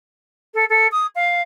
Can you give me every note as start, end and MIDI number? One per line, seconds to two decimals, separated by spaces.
0.54 0.64 69
0.69 0.87 69
0.91 1.06 87
1.15 1.41 77